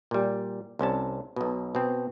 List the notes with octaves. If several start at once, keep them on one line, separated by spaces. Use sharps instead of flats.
A#2 G3
C2 C3 C#4 A5
B1 B2
B2 C4